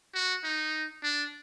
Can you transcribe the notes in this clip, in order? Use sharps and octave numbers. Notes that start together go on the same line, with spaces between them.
F#4
D#4
D4